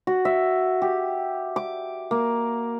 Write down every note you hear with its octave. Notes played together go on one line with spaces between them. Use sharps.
F#4
E5
G4
D6
A#3